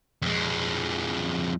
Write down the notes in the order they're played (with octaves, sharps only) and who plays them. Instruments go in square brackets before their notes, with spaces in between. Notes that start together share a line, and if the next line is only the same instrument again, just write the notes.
[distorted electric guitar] F2 G#3